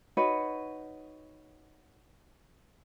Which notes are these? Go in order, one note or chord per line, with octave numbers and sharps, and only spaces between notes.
D#4 F#4 B4 C#5